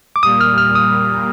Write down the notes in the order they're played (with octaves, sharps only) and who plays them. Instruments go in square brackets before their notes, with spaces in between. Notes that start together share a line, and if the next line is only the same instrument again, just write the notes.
[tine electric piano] D6
[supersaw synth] A#2 G3 A#3 [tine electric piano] D#6
[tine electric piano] F6
F6
D#6